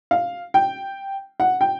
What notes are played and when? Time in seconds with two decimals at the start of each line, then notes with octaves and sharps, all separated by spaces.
0.11 F5
0.54 G5
1.40 F#5
1.61 G5